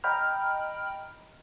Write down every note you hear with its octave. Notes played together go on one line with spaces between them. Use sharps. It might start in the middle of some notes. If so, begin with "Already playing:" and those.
D#5 G5 A#5 B5 F6